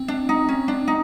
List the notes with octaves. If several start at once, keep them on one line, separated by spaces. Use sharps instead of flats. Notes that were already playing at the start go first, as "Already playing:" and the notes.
Already playing: C4
D4
D#4
C#4
D4
D#4